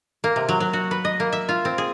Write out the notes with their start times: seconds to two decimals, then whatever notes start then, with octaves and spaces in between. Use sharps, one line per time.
0.24 A#3
0.36 C3
0.49 F#3
0.60 F#3
0.73 F#4
0.91 B4
1.05 D#5
1.20 A#3
1.32 E5
1.49 F4
1.65 C4
1.78 G#4